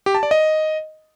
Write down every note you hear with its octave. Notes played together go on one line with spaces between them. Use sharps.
G4
A5
D5
D#5